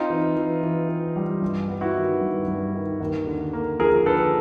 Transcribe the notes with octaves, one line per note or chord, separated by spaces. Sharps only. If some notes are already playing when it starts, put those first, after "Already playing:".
Already playing: C4 D#4 F4
E3
E3
E3
E3
G3
G2
B3
E4 F#4
D#3
G2
G2
D#3
D#2
D3
A#3
F3 G#4 A#4
D3 A4 B4